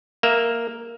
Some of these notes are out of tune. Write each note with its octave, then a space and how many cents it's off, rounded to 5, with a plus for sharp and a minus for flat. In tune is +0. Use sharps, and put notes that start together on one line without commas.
A#3 +0 E5 +0